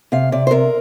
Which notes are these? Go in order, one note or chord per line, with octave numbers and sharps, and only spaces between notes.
C3 F5
C3 D5
C5
C3 A#4